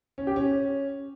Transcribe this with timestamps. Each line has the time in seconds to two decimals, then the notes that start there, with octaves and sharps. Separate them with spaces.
0.18 C#4
0.27 G4
0.36 C#4